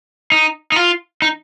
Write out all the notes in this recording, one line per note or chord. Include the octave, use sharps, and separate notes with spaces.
D#4
D#4
F4
D#4